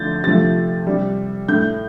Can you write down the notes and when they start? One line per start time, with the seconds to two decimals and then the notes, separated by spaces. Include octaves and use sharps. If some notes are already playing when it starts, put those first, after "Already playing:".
Already playing: D3 F3 A3 G6 A6
0.23 C3 F3 A3 A6
0.87 C3 G3
1.48 A2 A3 G6